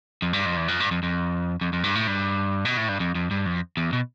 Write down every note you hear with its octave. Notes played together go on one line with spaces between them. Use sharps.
F2
G2
F2
E2
F2
G2
F2
F2
F2
F2
G2
A2
G2
B2
A2
G2
F2
F2
G2
F2
E2
B2